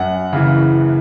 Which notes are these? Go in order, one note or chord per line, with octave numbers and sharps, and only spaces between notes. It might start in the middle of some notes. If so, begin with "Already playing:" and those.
Already playing: F#2 F#5
C#3 E3